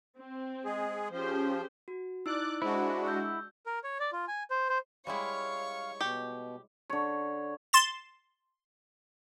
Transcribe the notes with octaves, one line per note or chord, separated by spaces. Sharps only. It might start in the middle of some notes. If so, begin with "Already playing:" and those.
C4
G#3 G#4
F3 C#4 G4 G#4 C5
F#4
D#4 E4 D5 D6 E6 F#6
G#3 D4 E4 F#4 C5
E6 G6
A#4
C#5
D5
F4
G#5
C5
C5
G3 G#3 E4 C#5 F5 C#6
B2 G4
D3 C#5
C6 A6 E7